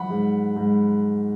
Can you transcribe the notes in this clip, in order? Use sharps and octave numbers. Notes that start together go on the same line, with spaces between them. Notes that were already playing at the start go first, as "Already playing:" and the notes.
Already playing: F#3 F#5 B5
G#2
G#2